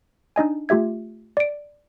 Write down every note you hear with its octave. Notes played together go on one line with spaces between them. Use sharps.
D4 D#4 D#5 G#5
A3 F4 G4 E5 G#6
D5 D7